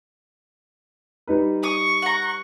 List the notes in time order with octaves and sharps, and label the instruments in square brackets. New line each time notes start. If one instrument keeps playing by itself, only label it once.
[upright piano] G3 D#4 B4
[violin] C#6 [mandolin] D#6
[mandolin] F#5 A#5